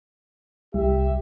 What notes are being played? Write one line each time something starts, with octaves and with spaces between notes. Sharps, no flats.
C2 G4 E5